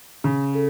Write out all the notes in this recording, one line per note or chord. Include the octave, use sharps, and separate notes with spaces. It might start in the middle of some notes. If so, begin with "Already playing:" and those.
C#3
A4